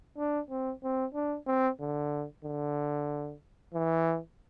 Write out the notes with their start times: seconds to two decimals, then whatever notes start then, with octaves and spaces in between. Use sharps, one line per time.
0.18 D4
0.50 C4
0.83 C4
1.14 D4
1.47 C4
1.80 D3
2.44 D3
3.74 E3